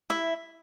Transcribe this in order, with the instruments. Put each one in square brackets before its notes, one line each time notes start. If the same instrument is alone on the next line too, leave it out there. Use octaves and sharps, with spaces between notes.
[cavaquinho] E4 E5